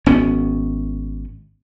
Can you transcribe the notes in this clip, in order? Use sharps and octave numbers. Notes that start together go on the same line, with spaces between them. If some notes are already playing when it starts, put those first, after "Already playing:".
G#1 B3 C#4